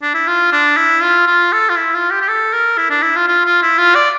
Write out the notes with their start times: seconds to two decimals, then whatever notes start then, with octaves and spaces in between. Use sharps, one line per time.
0.02 D4
0.14 E4
0.27 F4
0.53 D4
0.77 E4
1.02 F4
1.27 F4
1.52 A4
1.69 F4
1.77 E4
1.94 F4
2.11 G4
2.21 G4
2.28 A4
2.53 A#4
2.77 E4
2.90 D4
3.02 E4
3.16 F4
3.28 F4
3.45 F4
3.62 E4
3.78 F4
3.95 D5